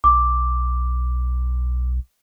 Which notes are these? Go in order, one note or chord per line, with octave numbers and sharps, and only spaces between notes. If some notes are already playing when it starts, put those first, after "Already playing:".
B1 D6